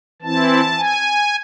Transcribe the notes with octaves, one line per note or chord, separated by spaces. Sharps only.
E3 C4 E4 A5
G#5